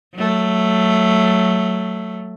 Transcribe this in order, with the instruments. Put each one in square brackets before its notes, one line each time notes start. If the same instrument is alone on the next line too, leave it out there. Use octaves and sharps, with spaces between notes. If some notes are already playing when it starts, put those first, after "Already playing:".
[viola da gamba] F#3 A3